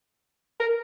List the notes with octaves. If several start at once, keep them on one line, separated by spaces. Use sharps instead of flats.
A#4